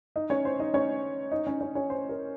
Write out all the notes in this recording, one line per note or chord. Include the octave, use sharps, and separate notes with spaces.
D#4 D#5
C#4 C#5
C5
D#4 D#5
C#4 C#5
D#4 D#5
C#4 C#5
C#4 C#5
C#4 C#5
C5
A#4